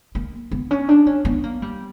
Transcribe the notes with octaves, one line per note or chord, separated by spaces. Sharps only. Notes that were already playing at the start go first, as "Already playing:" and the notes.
A#3
B3
C#4
D4
C#4
B3
A#3
G3